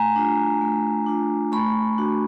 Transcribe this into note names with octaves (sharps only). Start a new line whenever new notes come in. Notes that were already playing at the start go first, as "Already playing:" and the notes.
Already playing: A3 G#5 A#5
D4 F4
A3
D4 F4
A3 B5 C#6
D4 F#4